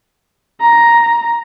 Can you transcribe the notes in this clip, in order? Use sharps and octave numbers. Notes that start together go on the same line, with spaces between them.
A#5